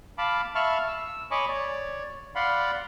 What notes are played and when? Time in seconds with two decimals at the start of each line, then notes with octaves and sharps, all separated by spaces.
0.18 F5 A5 B5 D6
0.55 E5 F5 A5 B5 C#6 F6
0.88 E6
1.31 C#5 D#5 G#5 B5 C#6 D6
1.49 C#5 D5
2.35 D5 F5 F#5 B5 C6